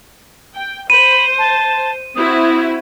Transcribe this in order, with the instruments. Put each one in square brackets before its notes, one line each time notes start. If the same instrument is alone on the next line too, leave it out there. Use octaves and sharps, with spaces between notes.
[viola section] G5
[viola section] C5 [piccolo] B5 [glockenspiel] D#7
[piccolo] A5
[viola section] C4 E4 F#4 [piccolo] D#6